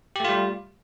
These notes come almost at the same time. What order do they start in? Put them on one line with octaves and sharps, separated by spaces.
G4 A3 F4 G3